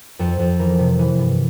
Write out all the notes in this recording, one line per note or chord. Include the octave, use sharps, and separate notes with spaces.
F2 A4
F2
E3 A#4
C3
E3
G2